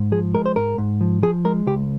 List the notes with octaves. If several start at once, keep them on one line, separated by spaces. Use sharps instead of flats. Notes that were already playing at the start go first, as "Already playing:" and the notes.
Already playing: G#2
F3 G#4
G#3 A#4
C5
G#2 A#4
G#2
F3
F3 G#4
G#3 A#4
C#2 G4